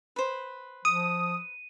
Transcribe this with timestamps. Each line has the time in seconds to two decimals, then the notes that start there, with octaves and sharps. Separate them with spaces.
0.16 B4 C5
0.85 F3 D#6 D#7